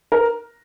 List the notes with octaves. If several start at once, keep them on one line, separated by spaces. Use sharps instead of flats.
A#4